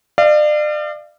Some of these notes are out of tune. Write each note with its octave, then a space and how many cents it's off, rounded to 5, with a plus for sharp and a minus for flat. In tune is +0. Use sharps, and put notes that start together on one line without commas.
D5 +35 F5 -30